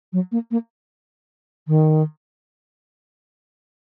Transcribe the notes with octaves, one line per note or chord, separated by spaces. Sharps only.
F#3
A#3
A#3
D#3